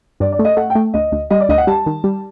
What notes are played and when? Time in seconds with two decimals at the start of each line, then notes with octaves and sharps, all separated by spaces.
0.20 G2 D5
0.32 D5
0.39 A3
0.45 D#5
0.57 A3 F#5
0.70 G5
0.75 A3
0.94 D2 D#5
1.12 D2
1.30 G3 D#5
1.40 D5
1.49 D2 D#5
1.58 F#5
1.67 G3 A5
1.86 D#3
2.04 G3